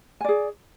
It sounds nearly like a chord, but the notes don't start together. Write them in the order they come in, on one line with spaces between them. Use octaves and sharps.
G#5 D5 G#4